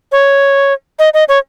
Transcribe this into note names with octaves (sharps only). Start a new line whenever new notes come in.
C#5
D#5
D#5
C#5